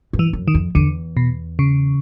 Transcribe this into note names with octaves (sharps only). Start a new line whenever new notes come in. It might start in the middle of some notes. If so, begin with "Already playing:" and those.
G2
E3
F#2
D#3
F2
E2 D3
B2
C#3